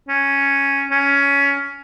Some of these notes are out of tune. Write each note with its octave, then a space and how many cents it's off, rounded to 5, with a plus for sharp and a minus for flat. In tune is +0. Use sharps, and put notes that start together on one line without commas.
C#4 +0
C#4 +15